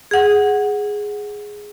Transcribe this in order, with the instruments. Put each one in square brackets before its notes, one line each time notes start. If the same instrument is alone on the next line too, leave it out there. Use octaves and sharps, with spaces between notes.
[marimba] G#4 F#5